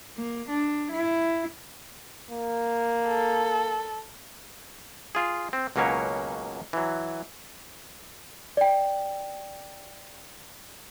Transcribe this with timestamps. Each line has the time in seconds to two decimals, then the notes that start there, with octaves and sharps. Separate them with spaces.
0.17 A#3
0.49 D4
0.92 E4
2.31 A#3
3.08 A4
5.15 F4 G#4
5.53 C4
5.76 C#2 B2 F#3 A#3 C#4 C#5
6.73 E3 F#3
8.57 D5 G5